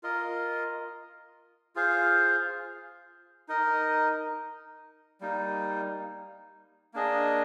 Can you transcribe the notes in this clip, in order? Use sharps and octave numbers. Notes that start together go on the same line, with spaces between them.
F4 A#4 D#5
F4 G#4 C5 F5
D#4 A#4 D#5
G3 A#3 D#4
A#3 D4 G#4 D#5